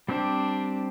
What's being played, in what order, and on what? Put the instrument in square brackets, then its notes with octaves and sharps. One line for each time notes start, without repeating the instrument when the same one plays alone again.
[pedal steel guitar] G3 C4 G4 C5 [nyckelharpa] D4